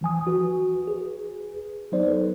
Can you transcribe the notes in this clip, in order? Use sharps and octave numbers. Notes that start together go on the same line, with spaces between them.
E3 F3 G#5 D#6
F#4 B4
G#4 B4
F#3 B3 D#4 C5 D5
A4 B4